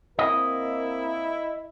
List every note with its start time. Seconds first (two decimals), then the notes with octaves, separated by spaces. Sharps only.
0.19 A#3 C4 E4 A#4 D#5